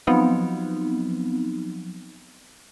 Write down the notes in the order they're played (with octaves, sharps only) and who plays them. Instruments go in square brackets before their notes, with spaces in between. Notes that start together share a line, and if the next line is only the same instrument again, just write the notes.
[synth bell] F3 F#3 B3 C4 D#4